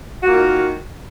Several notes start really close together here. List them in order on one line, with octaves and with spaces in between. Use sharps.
F#4 A#3 F4 D#3